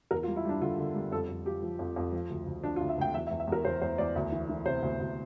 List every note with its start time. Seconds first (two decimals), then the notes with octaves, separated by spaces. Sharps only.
0.11 E2 A#4
0.23 F4
0.27 G3
0.36 E4
0.45 G3 D4
0.61 D3 F4
0.78 D3
0.95 G3
1.12 F2 A4
1.29 F2
1.46 F3 G4
1.63 F3
1.79 F2
1.96 F2
2.13 F3
2.30 D2
2.47 D2
2.63 F3 D4
2.76 F4
2.81 D2
2.89 E5
2.98 D2 G5
3.14 E2 E5
3.27 E5
3.31 E2
3.40 E5
3.47 E2 A#4
3.65 E2 C5
3.81 E2 C5
3.98 E2 D5
4.15 D2
4.32 E3
4.49 E3
4.66 C3 C5
4.82 D2
5.00 D2